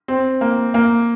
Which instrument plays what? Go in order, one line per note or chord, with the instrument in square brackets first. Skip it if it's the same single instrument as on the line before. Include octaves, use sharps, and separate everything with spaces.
[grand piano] C4
A#3
A#3